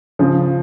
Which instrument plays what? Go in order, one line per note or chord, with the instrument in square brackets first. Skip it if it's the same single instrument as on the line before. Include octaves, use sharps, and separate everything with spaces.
[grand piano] C#3 [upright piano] F3